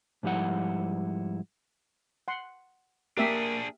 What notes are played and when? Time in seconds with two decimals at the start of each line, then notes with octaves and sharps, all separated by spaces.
0.23 G#2 F3 G3 E4 F#5
2.28 F#5 C6
3.17 A#3 D4 G4 G#4 A#4 E5